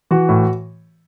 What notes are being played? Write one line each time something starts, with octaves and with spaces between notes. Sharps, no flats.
E3 F#4
A2